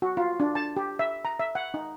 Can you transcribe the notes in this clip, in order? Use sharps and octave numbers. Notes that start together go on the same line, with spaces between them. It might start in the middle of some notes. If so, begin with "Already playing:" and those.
F#4
F4
D4
A5
G4
E5
A#5
E5
F#5
D#4